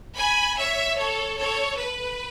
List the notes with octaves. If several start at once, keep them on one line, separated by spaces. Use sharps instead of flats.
G#5 B5
C#5 E5
A4 C#5
A4 C#5
B4